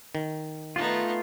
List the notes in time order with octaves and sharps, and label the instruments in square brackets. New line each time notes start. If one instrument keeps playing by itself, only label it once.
[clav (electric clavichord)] D#3
[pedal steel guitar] A3 F4 [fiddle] B3 D#4